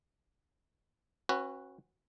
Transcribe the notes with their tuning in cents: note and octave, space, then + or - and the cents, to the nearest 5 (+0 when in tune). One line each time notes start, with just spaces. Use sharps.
C#4 -40 F#4 +0 B4 +0